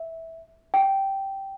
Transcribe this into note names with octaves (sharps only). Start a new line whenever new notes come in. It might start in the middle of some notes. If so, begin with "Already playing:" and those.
Already playing: E5
G5